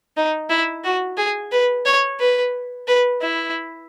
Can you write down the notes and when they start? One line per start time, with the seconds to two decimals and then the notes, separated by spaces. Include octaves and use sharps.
0.17 D#4
0.50 E4
0.84 F#4
1.18 G#4
1.52 B4
1.86 C#5
2.20 B4
2.88 B4
3.22 E4